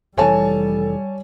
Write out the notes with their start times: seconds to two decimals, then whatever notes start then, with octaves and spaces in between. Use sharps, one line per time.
0.17 F1 E3 G3 A4 C#5 G#5 A5